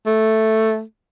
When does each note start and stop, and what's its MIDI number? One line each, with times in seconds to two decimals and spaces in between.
0.06 0.81 57